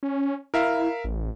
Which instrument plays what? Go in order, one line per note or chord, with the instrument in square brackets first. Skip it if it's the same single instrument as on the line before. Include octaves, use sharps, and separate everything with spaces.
[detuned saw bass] C#4
[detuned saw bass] E4 [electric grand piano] A#4 E5 F5
[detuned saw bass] A1